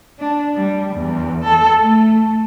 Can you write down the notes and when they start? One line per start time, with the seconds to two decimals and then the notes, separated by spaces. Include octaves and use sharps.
0.19 D4
0.55 G3
0.93 E2
1.44 A4
1.79 A3